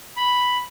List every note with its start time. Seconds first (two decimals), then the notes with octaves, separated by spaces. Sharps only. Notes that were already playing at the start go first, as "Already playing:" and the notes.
0.17 B5